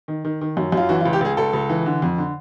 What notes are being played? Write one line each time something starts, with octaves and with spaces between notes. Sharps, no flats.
D#3
D#3
D#3
F#2
F#2 F4
E3 F#4
F4
C#2
G4
C#2 G#4
C#2 A4
C#2
E3
D3
F2
D3